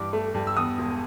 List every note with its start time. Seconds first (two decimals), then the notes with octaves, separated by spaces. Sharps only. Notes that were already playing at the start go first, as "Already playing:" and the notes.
Already playing: G2 E3 D6
0.13 A3
0.34 G2
0.47 E6
0.56 E2 D#6
0.78 E1